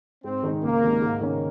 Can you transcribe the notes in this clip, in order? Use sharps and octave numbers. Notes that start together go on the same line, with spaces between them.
G#2 C4
D#3 G#3 D#4
C#2 A#3
C3 D#3 G#3
G#2
D#3 A#3 C#4